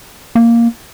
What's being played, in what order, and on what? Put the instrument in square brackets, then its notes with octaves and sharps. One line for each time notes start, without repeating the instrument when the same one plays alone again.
[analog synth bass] A#3